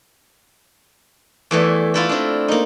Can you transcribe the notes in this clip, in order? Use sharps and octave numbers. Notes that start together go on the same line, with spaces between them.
E2 E3 A3 D5
A3 E4 F4
C4 D4
A#3 D#4